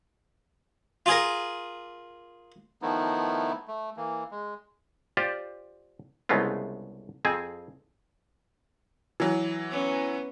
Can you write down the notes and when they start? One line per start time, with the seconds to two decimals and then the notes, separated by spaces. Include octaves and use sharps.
1.06 F4 G#4 A#4
2.82 D#3 F3 A3 B3 D#4 E4
3.68 A3
3.97 E3 A#3
4.31 G#3
5.17 F4 G4 C5 D5
6.29 C2 C#3 G#3 A3 B3 F4
7.25 F2 C4 G#4 G#5
9.20 E3 F#3
9.71 B3 C#4